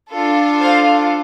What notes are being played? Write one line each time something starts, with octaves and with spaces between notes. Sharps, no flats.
D4 F4 A4
C5 F5